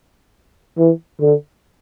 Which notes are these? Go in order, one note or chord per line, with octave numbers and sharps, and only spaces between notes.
E3
D3